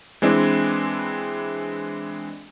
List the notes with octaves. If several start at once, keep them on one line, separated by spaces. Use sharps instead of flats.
E3 G#3 C4 D4 E4